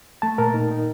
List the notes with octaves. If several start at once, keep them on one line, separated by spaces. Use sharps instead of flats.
A3 A5
A#2 A#4
D#4
D#4